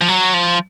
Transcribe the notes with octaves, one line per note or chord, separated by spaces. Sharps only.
F3
F#3
F3